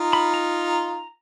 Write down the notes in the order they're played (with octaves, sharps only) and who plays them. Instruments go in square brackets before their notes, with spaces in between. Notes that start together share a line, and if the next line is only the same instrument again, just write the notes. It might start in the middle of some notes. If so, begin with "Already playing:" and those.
Already playing: [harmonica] D#4 F4
[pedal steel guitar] B5
A#5